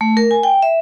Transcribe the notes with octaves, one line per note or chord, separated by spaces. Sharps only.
A3
A#4
G#5
G5
E5